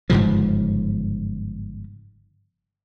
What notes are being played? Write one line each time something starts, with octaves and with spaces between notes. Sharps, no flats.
G1 G#2 C#3 F3